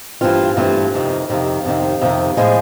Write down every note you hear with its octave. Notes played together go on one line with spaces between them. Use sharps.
G2 E3 A3 C4 F4
G2 E3 A3 C4 F4
F2 C3 D#3
F2 C3 D#3
F2 C3 D#3
F2 C3 D#3
A2 F3 G#3